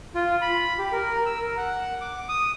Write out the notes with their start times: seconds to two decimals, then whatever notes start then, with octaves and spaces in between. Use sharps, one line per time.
0.15 F4
0.41 B5
0.78 G4
0.92 A#4
1.26 E6
1.42 A#4
1.57 F#5
2.01 D6
2.29 D#6